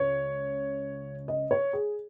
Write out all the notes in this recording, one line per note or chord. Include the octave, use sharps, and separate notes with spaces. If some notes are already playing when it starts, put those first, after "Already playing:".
Already playing: C#2 C#3 C#5
D#5
C#5
G#4